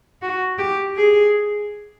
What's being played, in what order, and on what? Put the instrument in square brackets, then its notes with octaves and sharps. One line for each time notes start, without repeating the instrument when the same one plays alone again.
[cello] F#4
G4
G#4